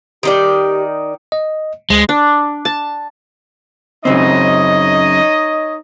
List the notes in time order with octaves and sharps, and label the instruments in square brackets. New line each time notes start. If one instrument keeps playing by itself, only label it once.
[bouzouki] D#3 D#4 D5 [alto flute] G4
[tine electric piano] D#5
[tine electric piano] D2 [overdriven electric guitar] G#3
[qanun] D4
A5
[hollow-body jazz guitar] F#2 C#3 C4 [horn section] D#4 C#5 D#5